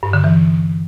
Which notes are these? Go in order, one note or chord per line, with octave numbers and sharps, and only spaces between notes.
G2
D3
E3